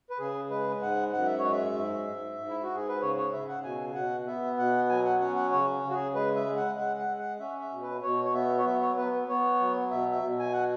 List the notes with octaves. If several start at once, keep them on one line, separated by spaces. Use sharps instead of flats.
B4
C#3 G#4
G#3 B4
G#2 F#5
F#2 F#5
E5
C#5
G#3
E5
G#2
G#2
G#2
E4
F#4
G#2
G#4
B4
C#3 C#5
C#5
C#3 E5
F#5
B2 G#5
B2 F#5
B3 E5
B2 F#5
F#3 G#5
F#5
C#4 F#5
F#5
C#3 C#5
C#3
F#4
G#4
G#3 B4
E5
G#3
F#5
G#3 F#5
F#5
G#3
F#5
C#4 E5
E5
B2
B4
B2 C#5
C#5
B3 E5
C#5
F#3 E5
C#5
B3 B4
B3 C#5
F#3
B2 E5
E5
B2
G#5
F#5